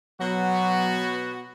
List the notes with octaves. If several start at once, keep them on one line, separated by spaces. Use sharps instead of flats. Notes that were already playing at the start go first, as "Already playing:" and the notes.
B2 F#3 B3 F#4